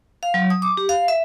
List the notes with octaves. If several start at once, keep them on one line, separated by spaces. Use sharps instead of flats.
F5
F#3
D#6
D6
G4
F5
E5